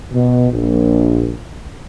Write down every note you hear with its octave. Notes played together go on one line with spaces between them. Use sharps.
B2
A#1